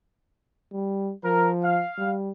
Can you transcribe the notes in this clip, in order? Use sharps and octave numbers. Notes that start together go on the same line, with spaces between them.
G3
F3 A#4
F5
G3